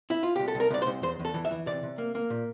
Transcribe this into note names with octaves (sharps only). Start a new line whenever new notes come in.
E4
F4
C2 G4
A4
C2 A#4
C2 D5
C5
C2
E2 C5
E2
A4
E3
E5
E3
C3 D5
C3
A#3
A#3
A#2